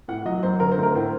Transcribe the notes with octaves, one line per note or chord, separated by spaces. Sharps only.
A2 F#5
F#3 D#5
F#2 C5
D3 A#4
C5
A3
A#4
A2 C5